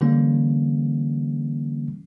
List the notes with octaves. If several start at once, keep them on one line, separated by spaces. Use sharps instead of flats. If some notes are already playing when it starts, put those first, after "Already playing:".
D3 E3 G3 A#3 C#4